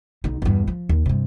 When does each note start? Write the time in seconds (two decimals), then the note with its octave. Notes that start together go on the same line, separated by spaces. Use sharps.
0.24 B1 D#4
0.42 E2 G2
0.67 F3
0.89 D#2
1.06 G2 C3